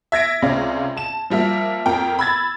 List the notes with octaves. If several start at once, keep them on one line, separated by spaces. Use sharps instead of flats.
E5 G#6 A#6 D7
C#2 C3 C#4 D5 F5 A#6
A5 E7
F3 G3 A#3 E5
F2 A#4 G5
B5 E6 G#6 A6